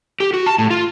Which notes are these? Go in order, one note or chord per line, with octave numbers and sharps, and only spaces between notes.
G4
F#4
A5
A2
F4